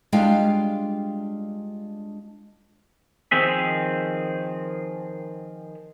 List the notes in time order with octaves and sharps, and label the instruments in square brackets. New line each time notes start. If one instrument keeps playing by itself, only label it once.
[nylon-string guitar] G3 G#3 D4 F4 F5 G5
[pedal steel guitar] D#3 F3 C4 G#4 E5